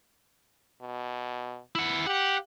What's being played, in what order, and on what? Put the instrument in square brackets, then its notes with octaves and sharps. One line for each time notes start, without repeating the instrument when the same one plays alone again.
[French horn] B2
[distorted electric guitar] E4 F#5
[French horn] G4 [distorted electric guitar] F#5